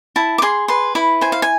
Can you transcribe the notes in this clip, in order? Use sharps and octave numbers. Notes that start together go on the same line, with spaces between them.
E4 A5
D6
G#4 C6
B4 C6
E4 B5
C5 G#5
F5
G#5